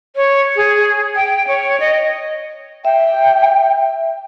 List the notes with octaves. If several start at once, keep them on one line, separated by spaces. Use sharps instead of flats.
C#5
G#4
G5
C#5
D#5
E5 G5